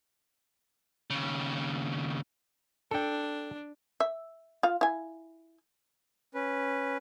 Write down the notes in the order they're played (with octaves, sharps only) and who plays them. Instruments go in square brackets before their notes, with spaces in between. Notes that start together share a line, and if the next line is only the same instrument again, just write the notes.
[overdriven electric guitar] D#2 C#3
[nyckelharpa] D4 [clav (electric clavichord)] A4 G5
[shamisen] E5
F4 F5
E4 G#5
[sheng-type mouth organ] C#4 B4